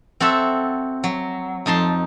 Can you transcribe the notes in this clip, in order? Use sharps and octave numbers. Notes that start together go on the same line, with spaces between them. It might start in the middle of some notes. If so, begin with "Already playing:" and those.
C4 F#4 A4 E5
F#3
F2 D#4 A5 C6